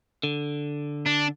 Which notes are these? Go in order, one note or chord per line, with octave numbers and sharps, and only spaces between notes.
D3
D4